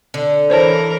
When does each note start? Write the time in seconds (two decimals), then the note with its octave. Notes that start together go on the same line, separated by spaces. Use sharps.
0.14 D3
0.50 E3 E4 A#4 C5 C#5 A5